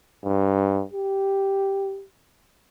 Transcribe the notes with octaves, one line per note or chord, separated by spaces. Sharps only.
G2
G4